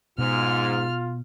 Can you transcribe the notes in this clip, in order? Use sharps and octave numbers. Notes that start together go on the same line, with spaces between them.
G#2 B2 F4 F6